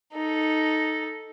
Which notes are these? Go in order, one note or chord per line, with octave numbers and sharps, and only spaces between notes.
D#4 A4